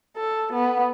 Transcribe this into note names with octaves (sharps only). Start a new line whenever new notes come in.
A4
B3